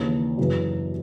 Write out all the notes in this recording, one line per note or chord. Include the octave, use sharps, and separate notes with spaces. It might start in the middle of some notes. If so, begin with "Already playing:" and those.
Already playing: D#2 C#3 E3 D4
F#2 C#3 E3